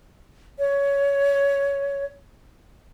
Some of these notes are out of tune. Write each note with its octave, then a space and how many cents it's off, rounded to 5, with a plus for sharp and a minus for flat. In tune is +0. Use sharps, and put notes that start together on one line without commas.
C#5 +15